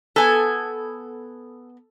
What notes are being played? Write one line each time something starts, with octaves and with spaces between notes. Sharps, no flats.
B3 A4 G#5